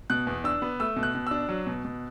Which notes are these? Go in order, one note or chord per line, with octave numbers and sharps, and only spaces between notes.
B2 F#6
E2
D4 E6
B3
A3 E6
B2
F#6
B2
D4 E6
F#3
B2
B2